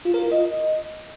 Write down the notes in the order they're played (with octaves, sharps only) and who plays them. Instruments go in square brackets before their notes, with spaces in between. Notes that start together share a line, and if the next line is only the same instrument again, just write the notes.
[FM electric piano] F4
A#4
F4
D#5